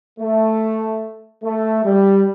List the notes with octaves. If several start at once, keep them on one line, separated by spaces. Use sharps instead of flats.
A3
A3
G3